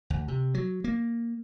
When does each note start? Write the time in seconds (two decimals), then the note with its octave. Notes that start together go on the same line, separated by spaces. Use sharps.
0.10 D2
0.28 C3
0.54 F#3
0.84 A#3